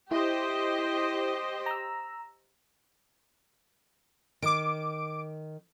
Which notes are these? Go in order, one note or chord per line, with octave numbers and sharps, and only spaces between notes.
E4 G4 C5 D#5
A#5 E6
D#3 D6 D7